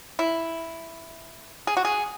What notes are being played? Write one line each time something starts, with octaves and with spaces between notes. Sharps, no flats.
E4
G#4
F#4
G#4